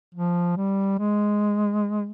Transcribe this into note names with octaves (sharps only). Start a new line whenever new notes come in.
F3
G3
G#3